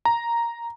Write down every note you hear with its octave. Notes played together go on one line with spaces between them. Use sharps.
A#5